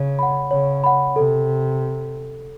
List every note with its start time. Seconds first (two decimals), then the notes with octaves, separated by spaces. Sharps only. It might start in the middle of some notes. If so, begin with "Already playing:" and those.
Already playing: C#3 C#5
0.19 F#5 B5
0.51 C#3 C#5
0.84 F#5 B5
1.16 C3 A4